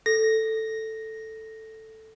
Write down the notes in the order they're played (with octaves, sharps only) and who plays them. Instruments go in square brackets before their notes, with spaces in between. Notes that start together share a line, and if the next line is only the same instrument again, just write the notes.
[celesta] A4 [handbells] A#6